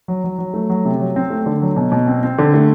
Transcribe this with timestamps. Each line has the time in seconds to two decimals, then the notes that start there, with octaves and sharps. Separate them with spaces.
0.08 F#3
0.24 F#3
0.39 F#3
0.54 A3
0.70 F#3
0.85 C3
1.00 F#3
1.16 C4
1.30 A3
1.46 D3
1.62 F#3
1.76 B2
1.92 B2
2.07 C4
2.23 C4
2.38 D3
2.54 A3